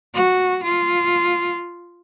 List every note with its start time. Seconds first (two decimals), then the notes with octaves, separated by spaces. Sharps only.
0.14 F#4
0.63 F4